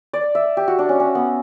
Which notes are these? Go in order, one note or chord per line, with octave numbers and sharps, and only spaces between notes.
D5
E5
G4
F#4
D4
C#4
C#4
B3